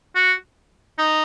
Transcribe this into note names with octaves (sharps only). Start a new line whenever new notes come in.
F#4
D#4